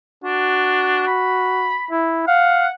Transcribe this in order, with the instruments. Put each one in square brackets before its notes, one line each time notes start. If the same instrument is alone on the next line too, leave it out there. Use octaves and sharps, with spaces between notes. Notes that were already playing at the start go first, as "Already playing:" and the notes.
[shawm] D4 [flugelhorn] F#4
[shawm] B5
[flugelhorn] E4
[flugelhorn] F5 [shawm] F#5